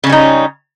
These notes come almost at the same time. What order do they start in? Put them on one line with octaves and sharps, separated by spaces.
C#3 C#4 G3 D#4